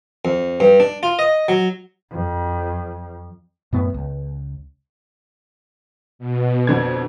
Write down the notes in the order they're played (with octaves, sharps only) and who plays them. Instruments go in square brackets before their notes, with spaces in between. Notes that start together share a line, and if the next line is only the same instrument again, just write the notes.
[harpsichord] F2
G2
D4
F4
D#5
F#3
[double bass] F2
[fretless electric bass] F#2 A2 B3
C#2
[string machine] B2
[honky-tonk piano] F2 D3 G#6